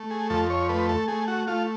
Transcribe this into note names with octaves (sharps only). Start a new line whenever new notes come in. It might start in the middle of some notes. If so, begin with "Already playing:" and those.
Already playing: A3
G#4
F2 A4
C#5
A3 B4
A4
A3 G#4
F#4
A3 F4